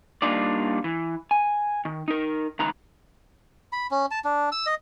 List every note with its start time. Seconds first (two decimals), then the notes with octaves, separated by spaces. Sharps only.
0.22 G3 A#3 D4 D#4 F4 D5
0.84 E3
1.31 G#5
1.85 D#3
2.08 D#4 A#4
2.59 C#2 D#3 B4 A#5
3.72 B5
3.91 C#4
4.11 A5
4.25 D4
4.52 E6
4.66 D#5